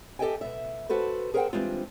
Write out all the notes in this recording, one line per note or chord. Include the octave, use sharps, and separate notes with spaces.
G4 A4 D5 D#5 G5 G#5
B2 E5
F#4 A4 B4 C5
G#4 A#4 C5 D#5 F#5 G5
E3 G3 G#3 C4 D4 F4